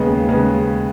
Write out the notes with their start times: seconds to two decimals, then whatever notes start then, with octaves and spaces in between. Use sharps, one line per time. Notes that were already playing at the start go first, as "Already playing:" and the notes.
Already playing: D#2 C#3 G#3 B3
0.29 C#3 G#3 B3